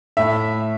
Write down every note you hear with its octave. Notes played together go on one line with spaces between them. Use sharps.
A2 E5